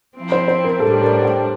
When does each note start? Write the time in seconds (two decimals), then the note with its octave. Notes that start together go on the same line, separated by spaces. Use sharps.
0.16 F3 C4 E4
0.32 C5
0.48 C5
0.64 A#4
0.80 A2 G3 D4 A4
1.01 A#4
1.23 G5